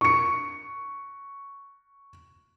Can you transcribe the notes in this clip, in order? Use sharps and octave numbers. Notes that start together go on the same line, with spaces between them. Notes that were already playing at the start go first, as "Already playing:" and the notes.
C#6 C#7